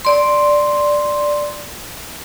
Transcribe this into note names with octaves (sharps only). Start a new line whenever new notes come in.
D5 C6